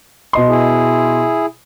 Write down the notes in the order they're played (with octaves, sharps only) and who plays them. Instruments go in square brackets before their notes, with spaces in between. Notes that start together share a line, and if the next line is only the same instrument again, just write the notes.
[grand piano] B2 D#5 C6
[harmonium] E4 G#4